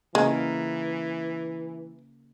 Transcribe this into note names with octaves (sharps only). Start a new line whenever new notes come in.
C#3 E3 G#3 A#3 A#4